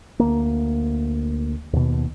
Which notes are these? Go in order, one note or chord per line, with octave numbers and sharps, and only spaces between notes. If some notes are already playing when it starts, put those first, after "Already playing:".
D2 A#3
D#2 B2